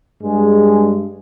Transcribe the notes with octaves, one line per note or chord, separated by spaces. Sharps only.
G2 G#3